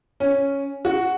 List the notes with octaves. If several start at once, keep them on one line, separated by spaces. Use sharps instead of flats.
C#4
F#4